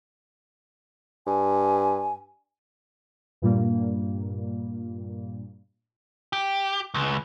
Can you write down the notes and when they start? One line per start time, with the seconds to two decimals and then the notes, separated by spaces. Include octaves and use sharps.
1.27 G2 G#5
3.42 G2 A#2 G3 A#3
6.33 G4
6.94 C#2